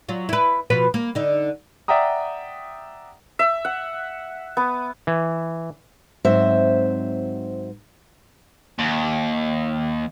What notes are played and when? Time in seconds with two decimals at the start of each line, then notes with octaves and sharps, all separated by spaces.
0.09 F#3 F4
0.29 E4 B4
0.70 B2 F3 B4
0.94 A#3
1.15 D3 D#4
1.88 D5 E5 F#5 G5 A#5 D#6
3.39 E5
3.65 F#5
4.57 B3
5.07 E3
6.25 G#2 F#3 C4 C5 E5
8.79 D#2